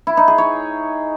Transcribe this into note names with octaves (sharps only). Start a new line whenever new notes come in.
E4
D#4
G#4
C#5